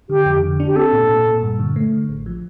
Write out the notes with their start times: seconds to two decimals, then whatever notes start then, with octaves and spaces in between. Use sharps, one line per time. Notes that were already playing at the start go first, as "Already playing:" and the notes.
0.09 D3 G4
0.25 F2
0.43 D3
0.60 D4
0.67 G4
0.76 C4 A4
0.93 A#2
1.09 A#2
1.26 A#2
1.42 G2
1.59 D3
1.76 A3
1.92 D3
2.09 A1
2.26 F3